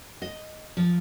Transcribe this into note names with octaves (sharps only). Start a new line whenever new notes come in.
D#5
F3